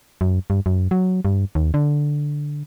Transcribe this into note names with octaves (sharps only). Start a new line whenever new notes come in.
F#2
G2
F#2
F#3
G2
D#2
D3